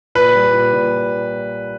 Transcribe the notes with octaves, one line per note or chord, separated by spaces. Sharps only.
A#2 B4
G3
A#2
A#2